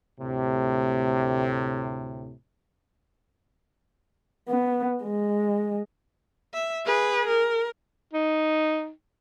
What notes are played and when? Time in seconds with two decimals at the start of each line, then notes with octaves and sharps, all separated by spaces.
0.20 D2 A2 C3
4.48 B3
5.04 G#3
6.54 E5
6.85 G#4 B4
7.27 A#4
8.13 D#4